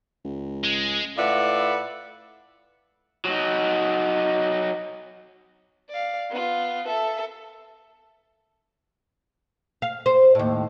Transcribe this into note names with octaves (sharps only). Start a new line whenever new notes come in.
C#2
G#3
A2 F4 B4 D5 E5 F#5
F#3 D#4
D5 F5
B3 F4
A4 E5
F5
C5
D#2 A2